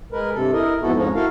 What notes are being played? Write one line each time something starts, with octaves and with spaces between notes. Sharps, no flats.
G#3 A#4 B4
G2 C3 A4
E4 A#4 D#5
F2 G#2 B3 E4 F#4 A4
F2 G#2 F3 G#3 C#4 D#4
E4 F#4 A4 A#4 F5